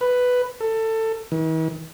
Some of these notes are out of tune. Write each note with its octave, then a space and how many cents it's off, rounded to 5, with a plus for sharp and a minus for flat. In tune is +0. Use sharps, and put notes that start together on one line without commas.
B4 +5
A4 +20
E3 -45